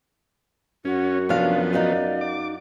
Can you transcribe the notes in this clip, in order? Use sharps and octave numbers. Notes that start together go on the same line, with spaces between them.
F#2 C#4 F#4
C3 F3 B3 D4 F5
D#4 F#4 D5 F5
D6